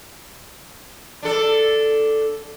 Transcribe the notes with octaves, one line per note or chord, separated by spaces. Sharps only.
D4 A4